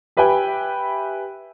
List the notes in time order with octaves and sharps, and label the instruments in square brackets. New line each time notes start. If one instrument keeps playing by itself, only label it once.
[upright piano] G4 B4 E5 G5 G#5